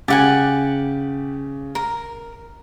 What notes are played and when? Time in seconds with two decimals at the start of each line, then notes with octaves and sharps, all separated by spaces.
0.08 C#3 G4 F#5 G#5 D6 A6
1.75 A#4